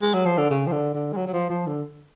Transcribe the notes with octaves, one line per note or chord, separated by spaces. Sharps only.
G#3
F#3
F3
D3
C#3
F3
D3
D3
G#3
F#3
F#3
F3
F3
D3